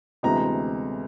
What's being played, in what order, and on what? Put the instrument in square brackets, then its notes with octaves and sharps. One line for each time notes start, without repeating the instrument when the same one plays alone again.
[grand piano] D2 C3 E3 G#3 B3 A#5